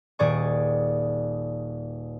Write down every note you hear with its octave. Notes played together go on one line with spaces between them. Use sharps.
D#1 G#4 D5 C#6